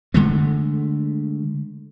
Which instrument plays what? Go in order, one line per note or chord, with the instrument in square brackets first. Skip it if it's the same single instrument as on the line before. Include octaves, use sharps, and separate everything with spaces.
[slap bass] D3 G#3 A3